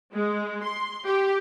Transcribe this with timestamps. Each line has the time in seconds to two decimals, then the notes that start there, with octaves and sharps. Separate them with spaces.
0.13 G#3
0.64 C6
1.05 G4